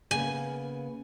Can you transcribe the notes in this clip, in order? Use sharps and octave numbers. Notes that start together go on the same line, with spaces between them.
C#3 A#3 B3 G#5